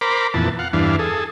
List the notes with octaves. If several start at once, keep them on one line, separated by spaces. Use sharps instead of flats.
A#4 C5 B5 D6
F2 A#2 E3 B3 A5
F5 F#5
E2 G2 E3 D4 F5
G#4 A4